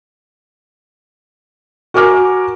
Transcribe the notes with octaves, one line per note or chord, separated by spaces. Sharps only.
F#4 A#4 G#5 D6 F6